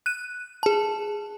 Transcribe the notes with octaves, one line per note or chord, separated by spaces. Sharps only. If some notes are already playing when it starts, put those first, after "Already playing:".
F#6 D#7
G#4 A5